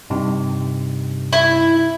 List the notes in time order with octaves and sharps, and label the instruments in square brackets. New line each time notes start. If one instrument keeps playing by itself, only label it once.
[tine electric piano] G2 C3 D#4
[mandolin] E4